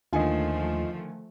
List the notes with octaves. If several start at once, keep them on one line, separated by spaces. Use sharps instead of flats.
D#2 D3 D#3 F3 A3 F4 D#5 G#5